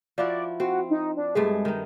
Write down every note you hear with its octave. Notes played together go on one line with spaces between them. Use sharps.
F3 E4 F#4 D5
C4 F#4
D#4
D4
G2 G#3 A3 G#4
D#3 D#4